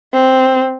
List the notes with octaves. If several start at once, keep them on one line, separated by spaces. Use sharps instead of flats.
C4